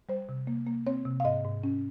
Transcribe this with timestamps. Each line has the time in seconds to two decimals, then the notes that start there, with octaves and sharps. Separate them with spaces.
0.09 G3 C5
0.29 C3
0.47 A#3
0.67 A#3
0.87 C4 C#5
1.05 C3
1.20 F5
1.24 G#2 D#5
1.44 G#2
1.64 C#4